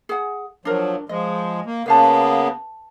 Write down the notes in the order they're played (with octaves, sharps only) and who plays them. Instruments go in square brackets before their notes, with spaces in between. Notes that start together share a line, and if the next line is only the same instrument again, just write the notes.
[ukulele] G#4 F#5
[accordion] F3 F#3 [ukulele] D4 A#4
[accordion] F3 G#3 [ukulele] D#5
[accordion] A#3
[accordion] C#3 A#3 B3 [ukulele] B4 F5 A5